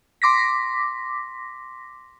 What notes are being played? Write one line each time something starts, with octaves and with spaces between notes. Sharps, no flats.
C6 D6 A#6 B6